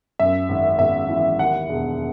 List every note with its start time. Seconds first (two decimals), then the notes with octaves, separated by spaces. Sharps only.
0.19 F#2 E5
0.49 G#1
0.79 G#1 E5
1.09 E3
1.39 D#2 F#5
1.69 E1